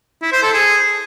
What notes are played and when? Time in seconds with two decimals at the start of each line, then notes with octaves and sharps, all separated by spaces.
0.22 E4
0.32 C5
0.43 A4
0.53 G#4